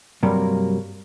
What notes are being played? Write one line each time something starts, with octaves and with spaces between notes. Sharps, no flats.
G2 C3 F#3 G3 A#3